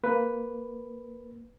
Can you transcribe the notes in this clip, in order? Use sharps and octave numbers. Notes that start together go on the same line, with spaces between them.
A#3 B4